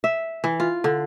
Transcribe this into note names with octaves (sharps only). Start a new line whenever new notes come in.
E5
E3
F4
D3